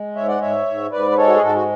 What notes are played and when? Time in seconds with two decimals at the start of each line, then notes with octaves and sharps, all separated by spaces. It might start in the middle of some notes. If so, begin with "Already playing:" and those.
Already playing: G#3
0.15 G#2 C#5 E5
0.28 D5 F#5
0.41 G#2 C#5 E5
0.66 G#2
0.91 G#2 B4 D5
1.11 B4
1.17 G#3 A4 C#5
1.27 F#4
1.34 G#4
1.42 G#2 F#4 A4
1.55 F#4